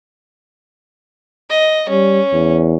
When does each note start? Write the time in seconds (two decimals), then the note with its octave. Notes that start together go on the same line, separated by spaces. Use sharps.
1.50 D#5
1.89 G3 C#4
2.33 E2